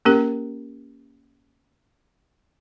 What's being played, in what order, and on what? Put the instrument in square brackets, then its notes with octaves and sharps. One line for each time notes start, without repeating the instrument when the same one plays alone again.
[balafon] A#3 C#4 G4 A#4